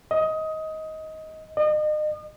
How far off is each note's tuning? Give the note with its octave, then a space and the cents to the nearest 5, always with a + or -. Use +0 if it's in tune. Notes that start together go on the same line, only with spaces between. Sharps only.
D#5 +15
D#5 -40